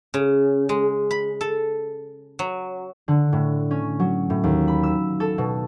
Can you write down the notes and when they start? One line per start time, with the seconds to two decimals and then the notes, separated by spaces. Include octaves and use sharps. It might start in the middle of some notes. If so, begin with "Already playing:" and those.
0.14 C#3
0.69 G#3
1.11 B5
1.41 A4
2.39 F#3
3.08 D3
3.32 A2
3.71 C#4
4.00 F#3
4.30 A2
4.44 D#2
4.68 B5
4.83 E6
5.20 A4
5.38 B2